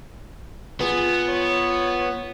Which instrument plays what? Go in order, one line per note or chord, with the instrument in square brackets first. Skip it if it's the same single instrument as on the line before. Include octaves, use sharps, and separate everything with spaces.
[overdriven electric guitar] B3 [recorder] F4 [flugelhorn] G#4
[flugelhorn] C#5